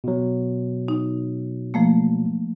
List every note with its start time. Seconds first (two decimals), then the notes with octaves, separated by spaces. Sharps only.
0.04 B2 F#3
0.88 D#4
1.74 F3 A3 A#3